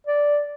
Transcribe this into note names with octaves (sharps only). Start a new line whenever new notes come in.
D5